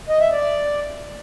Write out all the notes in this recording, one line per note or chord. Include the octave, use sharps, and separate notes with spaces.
D#5
E5
D5